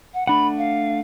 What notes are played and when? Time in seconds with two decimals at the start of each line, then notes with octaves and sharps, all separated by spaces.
0.14 F#5
0.27 A3 D4 F#5 B5
0.58 F5